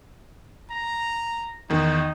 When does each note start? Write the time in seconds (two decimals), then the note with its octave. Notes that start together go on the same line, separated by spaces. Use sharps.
0.71 A#5
1.70 E2 D#3 D#4